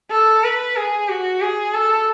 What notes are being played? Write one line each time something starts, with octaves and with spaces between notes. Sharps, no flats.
A4
B4
G#4
F#4
G#4
A4